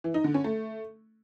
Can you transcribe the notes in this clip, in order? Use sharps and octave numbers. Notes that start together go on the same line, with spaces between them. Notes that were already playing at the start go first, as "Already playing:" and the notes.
E3
D#4
D3
C#4
A3